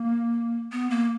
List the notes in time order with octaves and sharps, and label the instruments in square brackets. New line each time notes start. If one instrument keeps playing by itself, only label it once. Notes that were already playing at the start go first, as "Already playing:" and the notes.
Already playing: [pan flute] A#3
B3
A#3